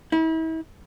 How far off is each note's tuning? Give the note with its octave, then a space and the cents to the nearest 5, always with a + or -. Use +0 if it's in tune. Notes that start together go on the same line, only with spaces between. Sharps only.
E4 -40